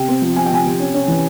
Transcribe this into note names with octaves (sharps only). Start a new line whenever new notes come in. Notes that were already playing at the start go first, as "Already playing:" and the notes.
Already playing: C3 G5
C4
F3
F3 G#5
G5
C3 G#5
C3
C#4
C#4
E3